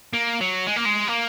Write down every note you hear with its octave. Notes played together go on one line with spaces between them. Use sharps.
A#3
F#3
G#3
A#3
G#3
A#3